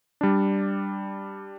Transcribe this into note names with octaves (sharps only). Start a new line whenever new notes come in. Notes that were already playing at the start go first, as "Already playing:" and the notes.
G3 D4